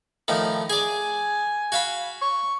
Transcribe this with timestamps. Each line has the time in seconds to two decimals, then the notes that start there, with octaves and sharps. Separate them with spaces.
0.28 A2 D#3 F3
0.70 G#4 D5 G#5
1.72 F#4 F5 B5
2.21 C#6